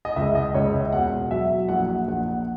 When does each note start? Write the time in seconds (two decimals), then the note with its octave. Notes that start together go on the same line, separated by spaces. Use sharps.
0.05 D#5
0.16 C#2 E5
0.35 D#5
0.55 C#2 C#5
0.74 E5
0.92 E1 F#5
1.31 F#3 E5
1.69 A#1 F#5
1.89 F#5
2.07 A#1 F#5
2.29 F#5